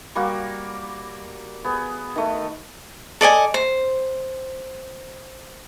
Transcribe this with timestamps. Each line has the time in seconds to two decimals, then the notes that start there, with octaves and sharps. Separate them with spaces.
0.15 G3 A#3 F#4
1.64 B3 G#4
2.16 D#3 A3
3.21 A4 D5 D#5 G#5
3.54 C5